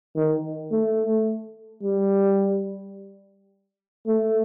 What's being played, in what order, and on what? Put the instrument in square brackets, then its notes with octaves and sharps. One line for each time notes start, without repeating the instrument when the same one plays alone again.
[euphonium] D#3
A3
G3
A3